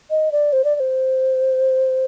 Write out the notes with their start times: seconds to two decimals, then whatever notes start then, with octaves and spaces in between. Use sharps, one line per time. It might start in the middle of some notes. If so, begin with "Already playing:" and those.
0.10 D#5
0.32 D5
0.53 C5
0.64 D5
0.75 D5
0.80 C5